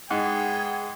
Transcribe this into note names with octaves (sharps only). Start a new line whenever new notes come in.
G#2 B3 G#4 F#5 G5